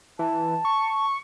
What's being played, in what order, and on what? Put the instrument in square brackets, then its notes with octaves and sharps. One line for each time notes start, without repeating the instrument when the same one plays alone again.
[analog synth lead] E3 [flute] A5
[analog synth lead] C#6